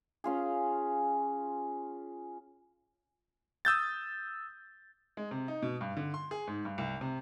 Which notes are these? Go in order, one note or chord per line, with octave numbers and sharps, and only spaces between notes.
C#4 F4 G#4
D#6 E6 G6 A6
G#3
C3
D#4
B2
G2
D3
C6
G#4
G#2
G2
C2
C3